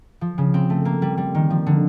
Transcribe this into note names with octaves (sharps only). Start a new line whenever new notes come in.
F3
C#3
C4
A3
A#3
G3
G3
D#3
F3
D3